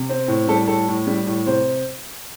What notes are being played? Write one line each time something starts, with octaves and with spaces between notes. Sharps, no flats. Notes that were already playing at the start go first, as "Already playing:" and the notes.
Already playing: C3
C4
A2
G3 A4
A2 A4
A2
G3
A2
C3 C5